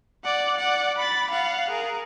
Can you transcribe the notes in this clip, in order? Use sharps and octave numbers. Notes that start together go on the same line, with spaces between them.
D5 F#5
D5 F#5
B5 A6
F5 F#5
G#4 A#4